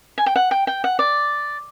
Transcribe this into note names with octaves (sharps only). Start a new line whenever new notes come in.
G#5
G5
F#5
G5
G5
F#5
D5